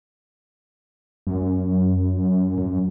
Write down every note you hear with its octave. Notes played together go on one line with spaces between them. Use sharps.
F#2
F#2